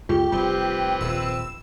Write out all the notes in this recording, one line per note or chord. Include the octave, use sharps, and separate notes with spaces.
C#2 F#2 F4 G4
F1 G3 C4 G4 B4
D#1 A#1 E6